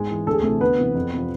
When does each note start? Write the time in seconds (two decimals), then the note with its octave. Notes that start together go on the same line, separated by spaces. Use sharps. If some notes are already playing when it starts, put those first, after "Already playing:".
Already playing: G#2 G#3 G#4
0.10 E3
0.27 D2 A4
0.34 G#4
0.42 C3 A3 A4
0.49 E3
0.61 D2 B3 B4
0.78 C3 E3
0.95 F2
1.13 C3 F3